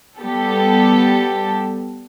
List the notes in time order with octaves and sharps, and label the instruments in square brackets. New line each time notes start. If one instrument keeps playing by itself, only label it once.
[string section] G3 B3 G4 A4